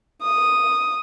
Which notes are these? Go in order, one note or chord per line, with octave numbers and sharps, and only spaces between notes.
D#6